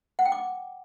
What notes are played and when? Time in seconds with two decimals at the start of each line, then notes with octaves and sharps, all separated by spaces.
0.19 F#5
0.25 G5
0.32 D6